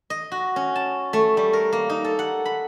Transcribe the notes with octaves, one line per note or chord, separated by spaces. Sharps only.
D#5
F#4
C#4
A5
A3
G3
A#4
A#3
D#4
A4
F#5
B5